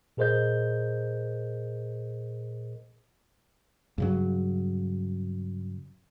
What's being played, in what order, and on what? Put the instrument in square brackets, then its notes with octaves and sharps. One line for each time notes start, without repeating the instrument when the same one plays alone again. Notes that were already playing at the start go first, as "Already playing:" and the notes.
[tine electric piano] A#2 G#4 A#4 C5 D#5 G6
[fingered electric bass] G2 C#3 F#3